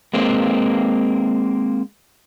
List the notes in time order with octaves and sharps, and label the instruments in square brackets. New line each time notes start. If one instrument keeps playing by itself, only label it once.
[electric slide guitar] G#3 A#3 C4